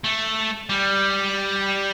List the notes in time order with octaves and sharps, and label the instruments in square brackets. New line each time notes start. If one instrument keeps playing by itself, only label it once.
[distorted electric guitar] A3
G3